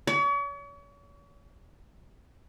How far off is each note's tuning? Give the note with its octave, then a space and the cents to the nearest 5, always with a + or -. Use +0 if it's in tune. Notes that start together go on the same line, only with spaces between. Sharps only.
C#5 +40